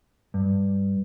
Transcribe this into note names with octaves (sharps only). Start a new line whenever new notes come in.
G2